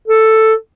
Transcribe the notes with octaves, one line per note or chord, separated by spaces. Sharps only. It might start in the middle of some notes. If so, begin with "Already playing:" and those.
A4